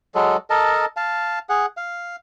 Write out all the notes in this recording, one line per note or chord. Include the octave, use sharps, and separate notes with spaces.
F#3 G#3 A4
A4 A#4 D#5 A5
F5 A5
G#4 F#5
F5